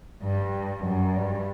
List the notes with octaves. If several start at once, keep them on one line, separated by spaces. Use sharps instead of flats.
G2
F#2
G2